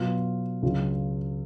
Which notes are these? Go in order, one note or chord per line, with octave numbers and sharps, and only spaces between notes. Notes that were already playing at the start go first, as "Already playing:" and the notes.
Already playing: B2 F#3 B3 F4
C#2 C#3 F#3 F4